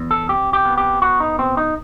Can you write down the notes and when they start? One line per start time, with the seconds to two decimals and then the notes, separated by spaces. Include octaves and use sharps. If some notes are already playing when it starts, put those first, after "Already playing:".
Already playing: E2
0.11 A4
0.28 C3 G4
0.53 G4
0.65 B3
0.77 G4
1.02 B3 F#4
1.20 D#4
1.38 B2 C4
1.57 D#4